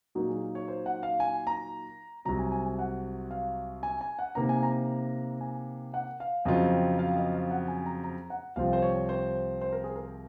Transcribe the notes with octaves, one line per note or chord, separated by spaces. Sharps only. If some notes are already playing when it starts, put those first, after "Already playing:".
A#2 F#3 A#3 D#4 F#4
G#4
C#5
C5
F#5
F5
G#5
A#5
C2 C3 F#3 A#5
G#5
G#5
G#5
F#5
F5
G#5
G#5
F#5
C3 D#3 A#3 A#5
G#5
A#5
G#5
F#5
F5
F2 C#3 F#3 C4 F4 D#5
F5
D#5
F5
F#5
G#5
A#5
A#5
F#5
C2 C3 F3 C4 F4 F5
C5
C#5
C5
C5
A#4
G#4
A#4